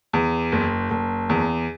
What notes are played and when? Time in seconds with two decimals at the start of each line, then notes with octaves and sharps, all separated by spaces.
0.13 E2
0.52 F#1
0.91 F#1
1.29 E2